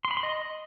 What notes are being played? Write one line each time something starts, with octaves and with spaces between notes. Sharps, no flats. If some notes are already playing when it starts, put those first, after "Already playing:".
C6
B5
C6
D#5